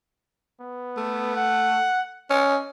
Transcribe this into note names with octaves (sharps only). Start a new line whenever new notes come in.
B3
A3
F#5
C#4 D#5